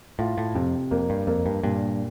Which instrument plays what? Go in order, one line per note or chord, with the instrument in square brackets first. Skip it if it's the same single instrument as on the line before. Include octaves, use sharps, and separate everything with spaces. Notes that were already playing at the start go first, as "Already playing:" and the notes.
[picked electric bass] A2 [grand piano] F4
[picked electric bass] A2
[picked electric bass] F2 [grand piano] C3
[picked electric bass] F2 [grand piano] A#3
[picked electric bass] G2
[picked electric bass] F2 [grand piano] A#3
[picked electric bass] G2
[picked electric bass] G2 [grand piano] A#2